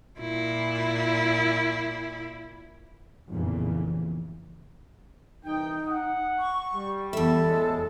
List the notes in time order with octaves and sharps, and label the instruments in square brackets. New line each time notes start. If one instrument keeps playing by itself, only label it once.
[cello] A#2 E4
[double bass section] F1 A#1 E2 A#2 C#3 E3
[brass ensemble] C2 E3 G5 [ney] D#4
[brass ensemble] F#5
[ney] C#6
[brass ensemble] G3
[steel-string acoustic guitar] E2 E5 [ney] A4
[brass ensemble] F#2 A2 G#3